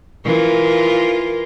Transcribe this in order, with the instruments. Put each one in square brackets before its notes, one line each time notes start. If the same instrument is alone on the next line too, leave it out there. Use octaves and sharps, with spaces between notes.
[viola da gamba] E3 F4 A#4